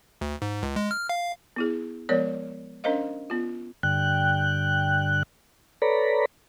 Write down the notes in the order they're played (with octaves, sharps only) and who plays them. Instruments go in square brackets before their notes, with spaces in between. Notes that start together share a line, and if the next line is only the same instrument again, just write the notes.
[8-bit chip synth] D2
G#2
C#2
G#3
F6
F5
[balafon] B3 E4 G#4
F3 G#3 B3 A#4 C#5 D5
C#4 D4 A#4 C5 D#5 F5
B3 F4
[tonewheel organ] G2 D3 G5 F#6
A4 B4 C#5 D5 A#5 B5